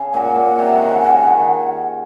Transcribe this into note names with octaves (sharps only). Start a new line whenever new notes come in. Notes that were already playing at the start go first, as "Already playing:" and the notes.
Already playing: C#3
A#2 F#5 G#5
A#2
C3
D#3
C#3
C#3
D#3